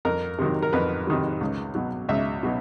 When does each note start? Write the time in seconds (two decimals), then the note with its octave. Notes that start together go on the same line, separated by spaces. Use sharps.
0.05 F2 A#4
0.39 C3 D#3 F#3
0.63 A#4
0.73 F2 B4
1.07 C3 D#3 F#3
1.41 C#2
1.75 B2 F#3
2.09 C#2 E5
2.43 B2 F#3